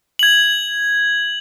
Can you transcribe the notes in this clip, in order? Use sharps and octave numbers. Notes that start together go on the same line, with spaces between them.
G#6 F#7